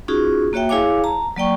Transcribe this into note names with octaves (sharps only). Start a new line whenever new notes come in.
C#4 D#4 F4 F#4 G#4
A#3 F#4 C#5 E5 G5
E4 G#4 C#5 F5 G#5 D6
A5 A#5
F#3 A#3 D5 G5 C#6